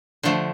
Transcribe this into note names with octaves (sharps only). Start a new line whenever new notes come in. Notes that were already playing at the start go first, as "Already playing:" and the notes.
D3 F3 A3